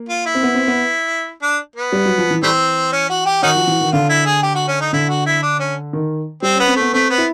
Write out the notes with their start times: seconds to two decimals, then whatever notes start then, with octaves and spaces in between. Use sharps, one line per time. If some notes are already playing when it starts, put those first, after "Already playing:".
Already playing: A#3
0.09 F4
0.26 E4
0.35 C4
0.43 B3
0.55 C4
0.68 B3
1.42 D4
1.76 B3
1.92 G3
2.06 F#3
2.18 F3
2.31 E3
2.43 E3 G3 A3 C4
2.92 C#4
3.10 F#4
3.26 G4
3.43 D#3 C#4 D#4 F#4
3.55 F3
3.67 E3
3.81 D#3
3.92 D3 F4
4.09 E4
4.26 G#4
4.43 G4
4.55 F#4
4.68 C#4
4.81 D#4
4.93 D3 E4
5.09 F#4
5.26 E4
5.43 D4
5.60 C#4
5.93 D#3
6.42 G3 C4
6.55 B3 C#4
6.68 C4
6.76 A3 B3
6.93 A3 C4
7.10 B3
7.18 E4